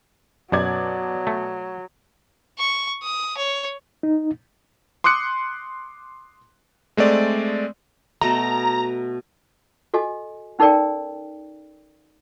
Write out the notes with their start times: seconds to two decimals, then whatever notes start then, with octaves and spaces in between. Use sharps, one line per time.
0.52 F#2 B2 F#3 D5 G#6
1.27 A3
2.59 C#6
3.03 D#6
3.37 C#5
4.03 D#4
5.04 C6 D6 D#6 F#6 C#7
6.97 G#3 A3 C4 D5
8.21 B2 A3 A#5
9.94 F#4 A4 D#5 G#5
10.59 C#4 D#4 A4 A#4 D5 G5